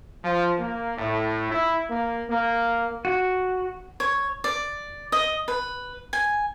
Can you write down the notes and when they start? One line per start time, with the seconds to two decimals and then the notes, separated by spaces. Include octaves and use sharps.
0.24 F3
0.59 A#3
0.97 A2
1.51 E4
1.90 A#3
2.29 A#3
3.05 F#4
4.00 C#5
4.44 D5
5.12 D#5
5.48 B4
6.13 G#5